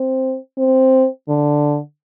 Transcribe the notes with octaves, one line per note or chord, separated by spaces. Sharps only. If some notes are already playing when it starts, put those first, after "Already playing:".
Already playing: C4
C4
D3